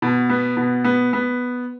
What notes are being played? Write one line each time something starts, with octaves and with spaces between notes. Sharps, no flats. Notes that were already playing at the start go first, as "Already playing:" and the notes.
B2
B3
B2
B3
B3